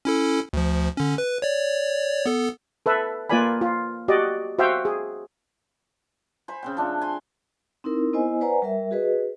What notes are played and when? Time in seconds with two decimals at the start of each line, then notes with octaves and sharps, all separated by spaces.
0.05 C#4 E4 A4
0.53 D2 F3
0.97 D3 C#4
1.18 B4
1.42 C#5 D5
2.26 B3 A4
2.86 A4 B4 E5
3.29 A#3 F4 B4 D5 G#5 B5
3.61 F4
4.08 F#4 G4 D5 D#5
4.59 F#4 C5 E5 F5 G5
4.85 G#4
6.48 C5 G#5 B5
6.63 C#3 C4 G5
6.77 F3 A3 D4
7.01 G#5 C6
7.84 C4 D#4 E4 A#4
8.13 B3 E4 C5 D#5 G#5
8.41 B4 C5 D5 F#5 G#5 A#5
8.62 G3 A#4 E5
8.91 F#4 G#4 B4 D#5